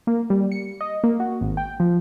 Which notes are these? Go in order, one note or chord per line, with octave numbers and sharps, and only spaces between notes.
A#3
G3
C#7
D#5
A#3
F#4
G#1
G5
F3